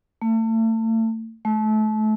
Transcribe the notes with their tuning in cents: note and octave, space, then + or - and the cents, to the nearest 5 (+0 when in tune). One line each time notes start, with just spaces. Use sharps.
A3 +35
A3 -30